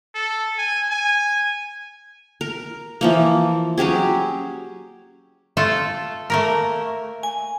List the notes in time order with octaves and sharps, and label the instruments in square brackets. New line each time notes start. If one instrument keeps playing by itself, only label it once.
[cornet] A4
G#5
G#5
[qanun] A#4
E3 F3 A#3
F#3 C#4 G4 G#4
[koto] A3 F4 A4
A3 A#3 A#4
[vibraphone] G#5